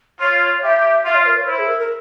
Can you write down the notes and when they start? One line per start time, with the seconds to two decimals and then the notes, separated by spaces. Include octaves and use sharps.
0.20 F4 C#5
0.63 G4 E5
1.05 F4 E5
1.15 C#5
1.26 A#4
1.37 C#5
1.47 E4 C5
1.58 G#4
1.68 A#4
1.79 A#4